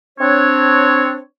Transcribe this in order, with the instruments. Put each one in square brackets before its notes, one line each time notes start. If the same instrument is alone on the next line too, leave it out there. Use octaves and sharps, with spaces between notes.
[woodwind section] C4 D4 C#5